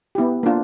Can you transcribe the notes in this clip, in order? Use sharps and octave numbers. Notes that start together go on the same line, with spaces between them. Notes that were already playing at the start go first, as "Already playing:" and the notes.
B3 E4 G4
A#3 D4 F4